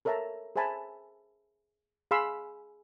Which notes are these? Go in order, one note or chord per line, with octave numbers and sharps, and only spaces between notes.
A4 A#4 C#5 E5 A5 A#5
G#4 C5 E5 G#5 A5 B5
G#4 F5 B5 C6 E6